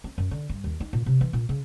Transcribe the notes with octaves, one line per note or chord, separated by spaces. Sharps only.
C4
F#2
D3
G2
D#2
D#4
A#2
C3
E3
A#2
C#3